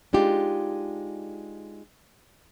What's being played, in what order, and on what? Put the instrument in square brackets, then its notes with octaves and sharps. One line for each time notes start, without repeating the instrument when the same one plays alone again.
[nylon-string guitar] G#3 D4 D#4 F4 G4